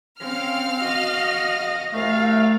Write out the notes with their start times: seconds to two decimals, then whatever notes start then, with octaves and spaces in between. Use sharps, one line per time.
0.20 C4 C#4 F5 F6
0.81 F#4 D#5
1.93 C2 A3 F5